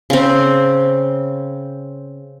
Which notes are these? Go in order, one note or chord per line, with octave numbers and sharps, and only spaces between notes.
C#3 C4